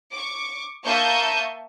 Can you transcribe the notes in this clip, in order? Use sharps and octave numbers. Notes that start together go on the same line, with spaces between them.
C#6 D6
A#3 E5 A5 C#6 D#6 G6